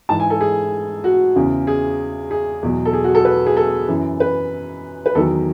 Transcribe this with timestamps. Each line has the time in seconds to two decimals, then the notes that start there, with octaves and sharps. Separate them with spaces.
0.09 G#2 E3 A5
0.20 G#5
0.30 A4
0.41 G#4
1.04 F#4
1.36 E2 C#3 E3
1.67 G#4
2.31 G#4
2.62 E2 B2 F#3
2.85 A4
2.93 G#4
3.04 F#4
3.15 A4
3.25 B4
3.46 G#4
3.57 A4
3.88 F#2 E3
4.20 B4
5.06 B4
5.15 E2 D#3 F#3 A4